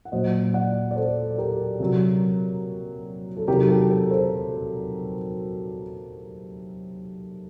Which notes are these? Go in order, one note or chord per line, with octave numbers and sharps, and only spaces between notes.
F#5
A#2 F#3 C5 D#5
D5 F#5
D5
A4 C5
G4 A#4
C3 F#3
A4
C3 D#3 F#3 G4 A#4
F#4 A4
G4 A#4
A4 C5